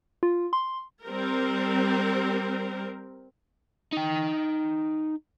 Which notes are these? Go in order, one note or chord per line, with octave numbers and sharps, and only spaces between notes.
F4
C6
G3 C4 A#4
D#4 G5